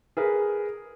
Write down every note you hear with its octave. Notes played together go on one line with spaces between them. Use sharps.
G#4 A#4 B4